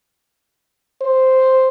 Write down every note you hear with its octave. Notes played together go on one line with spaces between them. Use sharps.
C5